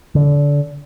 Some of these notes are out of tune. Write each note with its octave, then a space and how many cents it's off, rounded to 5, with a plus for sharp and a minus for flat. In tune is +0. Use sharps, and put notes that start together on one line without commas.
D3 -25